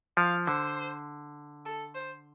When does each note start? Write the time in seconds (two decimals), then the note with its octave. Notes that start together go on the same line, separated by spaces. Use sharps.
0.17 F3 F5
0.46 D3 C5
1.65 A4
1.95 C5